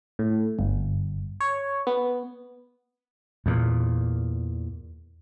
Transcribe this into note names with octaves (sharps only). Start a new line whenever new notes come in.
A2
G1
C#5
B3
E2 A#2